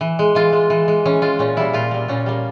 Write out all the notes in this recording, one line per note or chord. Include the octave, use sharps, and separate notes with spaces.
E3
G#3
E3 F4
G#3
E3
G#3
E3 C#4
G#3 F4
A#2 C#4
G3 A#3 E4
A#2 F4
G3 A#3
A#2 C#4
G3 A#3